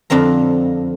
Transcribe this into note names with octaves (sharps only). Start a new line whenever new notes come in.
F2 D3 C4 A#5